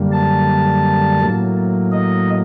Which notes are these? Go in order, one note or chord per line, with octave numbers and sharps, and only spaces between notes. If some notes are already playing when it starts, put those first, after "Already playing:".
Already playing: F#2 D3 G3 A#3
A5
A2 F#3 A#3
D#5